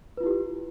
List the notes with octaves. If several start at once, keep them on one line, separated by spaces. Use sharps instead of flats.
E4 F4 G4 B4